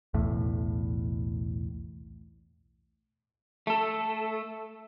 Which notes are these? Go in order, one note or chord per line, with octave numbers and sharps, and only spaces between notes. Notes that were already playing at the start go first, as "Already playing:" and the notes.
B1 E2 A2
A3 A4